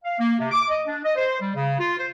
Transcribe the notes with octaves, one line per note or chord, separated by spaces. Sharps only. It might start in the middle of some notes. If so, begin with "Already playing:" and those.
F5
A#3
C3
D6
D#5
D4
D#5
C5
G3
C#3
F4
C5